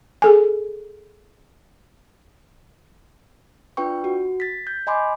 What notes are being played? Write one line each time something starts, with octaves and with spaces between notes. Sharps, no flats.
G#4 A4 G#5
D4 F4 B4 G5 C#6
F#4
A6 B6
G6
D#5 G#5 B5 C6 D6